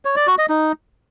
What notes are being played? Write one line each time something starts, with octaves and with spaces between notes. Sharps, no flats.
C#5
D5
F#4
D#5
D#4